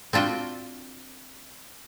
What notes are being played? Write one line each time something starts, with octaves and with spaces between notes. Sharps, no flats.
C4 D4 F4 F#4 G5